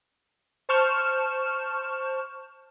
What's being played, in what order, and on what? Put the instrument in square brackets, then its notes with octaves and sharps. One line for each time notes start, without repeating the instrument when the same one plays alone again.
[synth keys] C5 A5 C#6 F6 G6 E7